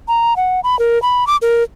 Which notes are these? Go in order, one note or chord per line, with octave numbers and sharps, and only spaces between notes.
A#5
F#5
B5
A#4
B5
D6
A#4